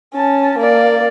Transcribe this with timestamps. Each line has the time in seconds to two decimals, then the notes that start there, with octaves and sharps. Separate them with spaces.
0.14 C#4 A5
0.58 A#3 D5